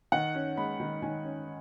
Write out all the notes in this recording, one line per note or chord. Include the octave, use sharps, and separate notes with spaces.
D#3 F#5
C#4
G#3 B5
D#3
D#3 G#5
C#4